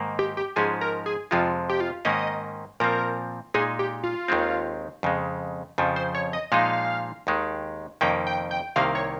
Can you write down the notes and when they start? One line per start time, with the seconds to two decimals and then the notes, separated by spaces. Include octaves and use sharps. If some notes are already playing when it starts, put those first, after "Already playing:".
Already playing: G#2 D#3 A#3
0.19 G4
0.37 G4
0.56 G#2 F3 G#3 C#4 G#4
0.81 A#4
1.06 G#4
1.31 F2 C3 F3 G#3 F4
1.69 G4
1.80 F4
2.05 G#2 D#3 A#3 C#4 D#5
2.80 A#2 F3 C4 A#4
3.54 A#2 G#3 D#4 G#4
3.79 G4
4.04 F4
4.28 D#2 D#3 G#3 C4
5.03 F2 C#3 G#3
5.78 F2 C#3 F3
5.96 C5
6.15 C#5
6.33 D#5
6.52 A#2 F3 G#3 D#4 F5
7.27 D#2 D#3 G#3
8.01 F2 C3 D#3 A#3 C#4 G5
8.27 G5
8.51 G5
8.76 C2 C3 D#3 A#3 F5
8.95 C#5